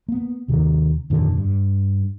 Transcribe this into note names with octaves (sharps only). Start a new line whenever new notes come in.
A#3 B3
D#2 C3 D#3
F2 A#2 D3 D#3
G2